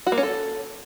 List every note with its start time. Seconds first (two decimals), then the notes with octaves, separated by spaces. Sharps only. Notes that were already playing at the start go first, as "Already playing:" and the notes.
0.07 F#4
0.12 A#3
0.18 C#4
0.23 A4